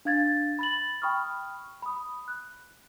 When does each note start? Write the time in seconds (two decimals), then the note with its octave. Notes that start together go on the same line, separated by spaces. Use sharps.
0.05 D4 F5 G#6 A6
0.59 B5 A6 F#7
1.02 G5 B5 C#6 D#6 F6
1.82 B5 D#6
2.28 F#6